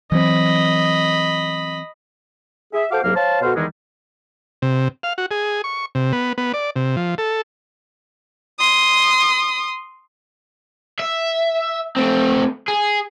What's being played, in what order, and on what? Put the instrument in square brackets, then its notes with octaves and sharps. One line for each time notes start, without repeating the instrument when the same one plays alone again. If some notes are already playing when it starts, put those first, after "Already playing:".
[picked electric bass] E3 F#3 C4 [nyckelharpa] D#5 B5
[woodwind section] G#4 E5
F#4 A4 C5 F5 D6
C2 G#2 F#3 A#3 F5 F6
C5 C#5 F5 A5
B2 F#4 A4 C5 F5
E2 D#3 E3 G3 G#3
[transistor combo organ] C3
F5
F#4
G#4
C#6
C3
B3
B3
D5
C3
F3
A4
[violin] C6 D#6
[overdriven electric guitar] E5
A3 C4
G#4